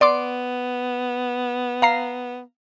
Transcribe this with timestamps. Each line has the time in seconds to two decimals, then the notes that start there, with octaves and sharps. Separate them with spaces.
0.01 B3 D5 C6 D6
1.82 F5 A#5 C7